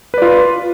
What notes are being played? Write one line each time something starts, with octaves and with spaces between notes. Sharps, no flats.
F4 B4 D5